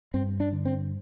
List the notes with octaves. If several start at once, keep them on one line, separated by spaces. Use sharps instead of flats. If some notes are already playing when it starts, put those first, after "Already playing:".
G2 C4
D4
D3
C4